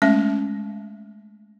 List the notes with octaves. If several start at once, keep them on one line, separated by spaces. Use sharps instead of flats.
G#3 A3 C#4 E5